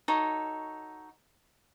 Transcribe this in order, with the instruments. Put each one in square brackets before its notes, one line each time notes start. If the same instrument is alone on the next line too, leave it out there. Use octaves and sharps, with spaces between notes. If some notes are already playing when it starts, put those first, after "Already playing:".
[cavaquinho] D#4 F#4 A4 C#5